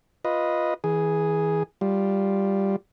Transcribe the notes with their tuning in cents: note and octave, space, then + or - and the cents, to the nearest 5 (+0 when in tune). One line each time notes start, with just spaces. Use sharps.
F4 +0 B4 -10 D#5 +0
E3 -30 G#4 +0
G3 +0 F4 +0